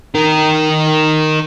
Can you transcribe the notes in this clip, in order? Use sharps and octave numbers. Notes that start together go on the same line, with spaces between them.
D#4 A#4